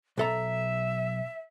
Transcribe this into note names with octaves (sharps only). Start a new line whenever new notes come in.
B1 A4 E5 A#5